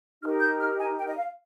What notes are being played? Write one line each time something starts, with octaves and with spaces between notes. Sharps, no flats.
D#4 G4 A#4 F6
G6
F6
G#5
G5
D#5
F5